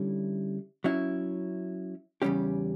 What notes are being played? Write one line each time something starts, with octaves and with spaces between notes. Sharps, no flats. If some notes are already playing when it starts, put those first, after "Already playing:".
Already playing: D3 G3 C#4 E4
F#3 C#4 E4
E2 C#3 G3 C#4 G4